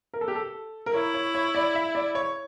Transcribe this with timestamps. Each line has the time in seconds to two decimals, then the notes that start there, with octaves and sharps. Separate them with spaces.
0.14 A#4
0.21 A4
0.28 G4
0.36 A4
0.86 A#4
0.94 E4 C#5
1.14 C#5
1.35 C#5
1.55 D5
1.75 E5
1.95 D5
2.15 C#5